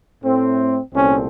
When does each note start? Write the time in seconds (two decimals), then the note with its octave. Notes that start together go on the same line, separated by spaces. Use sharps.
0.22 A2 A3 C4
0.93 C2 A#2 A3 C4 C#4